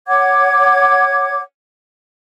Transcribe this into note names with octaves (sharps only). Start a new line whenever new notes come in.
C#5 F#5 D6 G#6